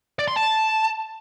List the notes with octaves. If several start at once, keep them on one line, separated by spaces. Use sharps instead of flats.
D5
C6
A5